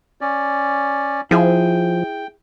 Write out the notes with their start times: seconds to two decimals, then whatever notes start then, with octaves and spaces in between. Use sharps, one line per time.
0.21 C#4 D5
1.31 F3 E4 G#4 E5 G5